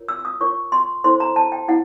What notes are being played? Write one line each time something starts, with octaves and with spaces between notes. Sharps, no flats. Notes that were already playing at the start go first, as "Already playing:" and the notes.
Already playing: F4 A#4 C#5
E6
E6
D#6
F4 A#4 C#5 C#6
C6
E4 A4 C5 C6
A#5
A5
G5
E4 F#5